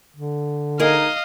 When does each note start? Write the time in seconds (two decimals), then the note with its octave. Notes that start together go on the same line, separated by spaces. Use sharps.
0.16 D3
0.80 D#4 G#4 A#4 D#5 F5